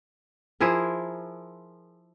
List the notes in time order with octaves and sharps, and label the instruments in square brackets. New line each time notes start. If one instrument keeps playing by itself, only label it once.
[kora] F3 E4 G#4 A#4